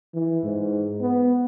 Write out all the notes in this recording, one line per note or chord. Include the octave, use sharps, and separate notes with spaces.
E3
G#2
B3